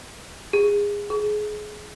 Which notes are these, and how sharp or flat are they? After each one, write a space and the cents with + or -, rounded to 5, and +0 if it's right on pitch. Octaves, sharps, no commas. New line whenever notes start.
G#4 -25
G#4 +25